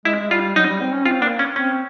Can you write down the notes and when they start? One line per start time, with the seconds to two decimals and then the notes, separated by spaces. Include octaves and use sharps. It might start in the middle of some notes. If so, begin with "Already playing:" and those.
0.05 G#3 E4
0.19 G#3
0.30 G3 F4
0.55 F#3 D#4
0.68 G3
0.81 C4
0.93 C#4
1.06 C4 F4
1.22 A#3 D4
1.39 C#4
1.56 C4 C#4